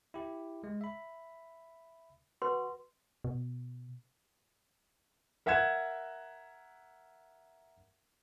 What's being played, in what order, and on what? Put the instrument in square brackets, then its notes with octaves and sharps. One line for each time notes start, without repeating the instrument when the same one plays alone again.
[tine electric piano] E4 G4
G#3
E5 B5
[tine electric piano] F#4 [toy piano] B4 C6
[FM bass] B2
[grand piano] A#4 E5 F#5 F#6 G#6 E7